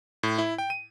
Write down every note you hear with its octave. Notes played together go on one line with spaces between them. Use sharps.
A2
E4
G5
D#7